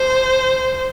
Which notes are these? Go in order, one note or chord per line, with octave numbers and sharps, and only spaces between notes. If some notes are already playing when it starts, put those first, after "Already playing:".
Already playing: C5